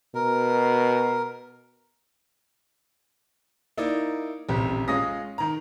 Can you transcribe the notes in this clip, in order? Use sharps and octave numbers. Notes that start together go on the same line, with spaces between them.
B2 A#4
A#3 D#4 E4 D5
D#1 A1 C3 G4
G#3 C#4 F4 D#6 A#6
D#3 A#5